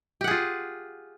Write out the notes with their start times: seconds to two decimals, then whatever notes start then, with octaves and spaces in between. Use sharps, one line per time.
0.21 G4
0.24 F#5
0.28 G#4
0.31 F4